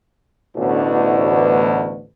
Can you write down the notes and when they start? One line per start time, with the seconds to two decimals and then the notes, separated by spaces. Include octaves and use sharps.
0.56 A1 D2 B2